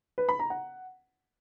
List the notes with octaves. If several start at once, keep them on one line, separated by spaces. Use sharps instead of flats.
B4
B5
A#5
F#5